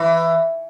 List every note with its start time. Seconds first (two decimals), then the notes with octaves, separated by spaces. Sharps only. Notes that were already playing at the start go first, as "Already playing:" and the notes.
Already playing: E3